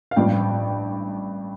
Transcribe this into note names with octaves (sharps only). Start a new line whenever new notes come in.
F5
A1 G2 F3 G5